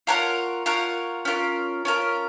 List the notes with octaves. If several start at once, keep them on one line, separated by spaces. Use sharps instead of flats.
F4 A#4 C#5 F#5
F4 A#4 C#5 F#5
C#4 F4 A#4
C#4 F4 A#4